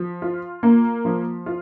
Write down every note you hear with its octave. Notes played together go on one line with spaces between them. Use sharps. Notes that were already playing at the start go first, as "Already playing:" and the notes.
Already playing: F3
F4
A#3
F3
F4